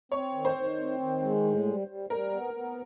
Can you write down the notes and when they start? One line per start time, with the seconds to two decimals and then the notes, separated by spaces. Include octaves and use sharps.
0.12 C4 C#5
0.34 D#3
0.45 C5
0.56 D#3
0.78 C4
1.00 D#3
1.22 G#3
1.44 A2
1.66 G3
1.88 G3
2.10 G3 A#4
2.32 B3
2.54 B3